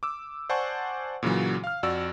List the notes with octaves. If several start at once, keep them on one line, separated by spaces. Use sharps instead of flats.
D6 E6
C5 D5 F#5 G#5 A5 C#6
A#2 C#3 E3 F#3
F5 F6
F2 F#4 D5 E6